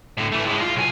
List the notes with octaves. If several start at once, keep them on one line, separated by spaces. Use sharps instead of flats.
A2 D3
E3 A3
A2 G#3
F4
B1 G#5